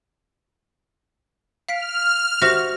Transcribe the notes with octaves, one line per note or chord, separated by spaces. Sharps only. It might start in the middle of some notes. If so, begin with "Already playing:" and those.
F5 F6 B6 D7
F#4 G4 C5 E5